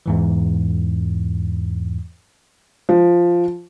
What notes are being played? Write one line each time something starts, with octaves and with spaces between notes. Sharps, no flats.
E2 G#2 E3
F3